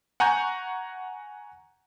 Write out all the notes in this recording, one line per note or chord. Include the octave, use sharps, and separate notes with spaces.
F#5 G#5 A#5 C#6 G6